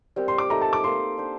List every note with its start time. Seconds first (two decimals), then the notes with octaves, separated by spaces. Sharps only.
0.16 G3 C4 G4 A#4
0.28 C6
0.38 D6
0.50 A3 D#4 A4 A#5
0.62 A5
0.73 D6
0.84 A#3 D#4 A4 C6
1.18 D4 G4 C5